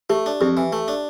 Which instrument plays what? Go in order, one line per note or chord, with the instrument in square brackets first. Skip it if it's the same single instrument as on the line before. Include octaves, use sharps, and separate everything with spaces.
[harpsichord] A3 [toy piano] G4
[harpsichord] D4
[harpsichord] F2 [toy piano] G4
[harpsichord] E3
A3
D4